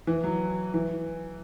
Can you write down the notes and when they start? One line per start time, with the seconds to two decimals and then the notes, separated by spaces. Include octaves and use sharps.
0.07 E3
0.24 F#3
0.74 E3